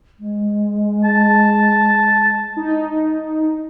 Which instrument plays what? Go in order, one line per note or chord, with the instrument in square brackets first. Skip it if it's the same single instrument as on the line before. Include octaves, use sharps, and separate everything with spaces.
[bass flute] G#3
[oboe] A5
[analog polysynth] D#4